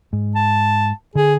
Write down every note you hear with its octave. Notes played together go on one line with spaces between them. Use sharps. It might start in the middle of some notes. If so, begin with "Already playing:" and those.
G#2
A5
D3 G#4